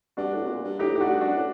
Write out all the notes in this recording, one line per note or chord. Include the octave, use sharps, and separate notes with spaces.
G2 D4 F#4
A2
C3
A#2
G2
A2 D#4 G4
A2 G4
D4 F#4
G2
D4 F#4
F#2
A2